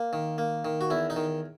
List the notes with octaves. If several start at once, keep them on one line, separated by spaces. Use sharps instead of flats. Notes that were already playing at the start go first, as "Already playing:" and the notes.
Already playing: A#3
D#3
A#3
D#3
F#4
E2 E4
D#4
D#3